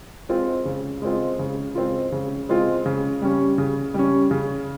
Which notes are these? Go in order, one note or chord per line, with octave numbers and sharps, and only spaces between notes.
G#3 C4 F4
C#3
G#3 C4 F4
C#3
G#3 C4 F4
C#3
G#3 C4 F4
C#3
G3 C#4
C#3
G3 C#4
C#3